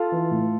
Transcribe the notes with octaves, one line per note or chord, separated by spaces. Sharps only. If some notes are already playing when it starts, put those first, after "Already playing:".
Already playing: F4 A4
E3
A2